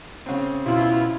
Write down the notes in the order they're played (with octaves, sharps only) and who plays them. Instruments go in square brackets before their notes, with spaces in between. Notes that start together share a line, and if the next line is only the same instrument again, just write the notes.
[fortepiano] C#3 C4
[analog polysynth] B2 E4 [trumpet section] F4